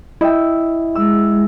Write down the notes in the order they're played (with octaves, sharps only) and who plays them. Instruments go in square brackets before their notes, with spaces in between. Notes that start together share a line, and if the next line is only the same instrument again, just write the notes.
[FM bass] E4 [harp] D#5 E5 G5
[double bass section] G#3 [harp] E6